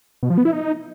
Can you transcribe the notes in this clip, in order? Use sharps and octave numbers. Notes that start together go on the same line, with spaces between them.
B2
F3
B3
E4
D#4